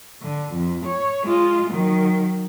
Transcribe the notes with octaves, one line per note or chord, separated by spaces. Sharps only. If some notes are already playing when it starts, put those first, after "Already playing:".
D3
F2
C#5
G#3 F4
D#3 F#3